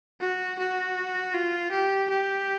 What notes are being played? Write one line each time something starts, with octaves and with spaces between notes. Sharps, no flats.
F#4
F#4
F4
G4
G4